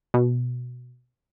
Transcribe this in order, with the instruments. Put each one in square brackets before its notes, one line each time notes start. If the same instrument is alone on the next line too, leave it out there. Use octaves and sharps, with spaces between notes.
[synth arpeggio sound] B2